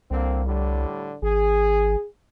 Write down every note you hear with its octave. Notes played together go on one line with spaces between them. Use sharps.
C2 D3 A#3 C4
A2 D3 G3
G#1 G#4